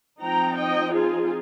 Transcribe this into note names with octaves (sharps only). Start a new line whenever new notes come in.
F3 C4 D#4 G5 A#5
D#5 G5
F4 G#4